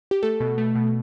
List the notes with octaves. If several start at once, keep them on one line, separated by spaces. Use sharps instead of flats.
G4
A3 A4
B2
A3
B2